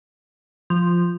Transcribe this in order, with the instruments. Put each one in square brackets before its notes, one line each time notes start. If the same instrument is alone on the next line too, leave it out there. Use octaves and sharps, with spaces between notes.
[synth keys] F3